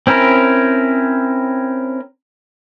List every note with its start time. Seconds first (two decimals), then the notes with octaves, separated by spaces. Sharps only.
0.07 C4 C#4 E4 A#4